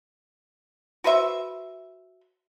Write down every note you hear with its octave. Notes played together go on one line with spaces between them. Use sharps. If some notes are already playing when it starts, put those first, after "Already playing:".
F#4 B4 C5 E5